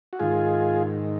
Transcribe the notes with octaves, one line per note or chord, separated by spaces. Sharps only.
F#4
G#2 D#3 F4 G#4